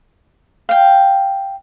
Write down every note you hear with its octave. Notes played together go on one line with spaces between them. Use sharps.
F5 G5